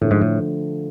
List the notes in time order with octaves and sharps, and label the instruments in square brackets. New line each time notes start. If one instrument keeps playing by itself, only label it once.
[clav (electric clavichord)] A2 [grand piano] D3 F3 A3
[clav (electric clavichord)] G#2
A2